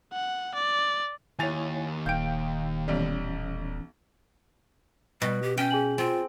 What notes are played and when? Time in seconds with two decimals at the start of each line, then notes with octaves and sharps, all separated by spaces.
0.13 F#5
0.55 D5
1.39 D#2 E4 C#5 G#5 A6 F7
2.06 D#1 F5 G5 G6 D7
2.88 B1 E3 G3 C#4
5.22 B2 G3
5.42 G4
5.57 C#4 G5
5.71 G#4 G#5 F#7
5.98 C4 F4